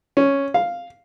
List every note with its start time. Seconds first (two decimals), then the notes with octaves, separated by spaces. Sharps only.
0.17 C#4
0.54 F5